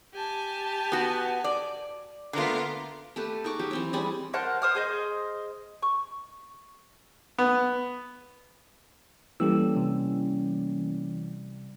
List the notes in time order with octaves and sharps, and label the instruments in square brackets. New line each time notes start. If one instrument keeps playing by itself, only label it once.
[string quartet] G4 G#5 A5
[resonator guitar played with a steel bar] B3 F#4
D5
[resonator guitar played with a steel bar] D3 A3 [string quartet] B3 F4 A#4
[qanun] A3 G4 A4 B4
D#4 G#4 C#6 D6
F#3 G4
E3 C4 C#5
G3 G#3 D5 G#5
[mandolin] A#4 C5 F#5 A5
C5 D#6 F6
G#4 C5 D#5
C#6
[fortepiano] B3
[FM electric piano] E3 [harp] G3 [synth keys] A#3 C#4 [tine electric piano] G4 A4 E6
[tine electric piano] C3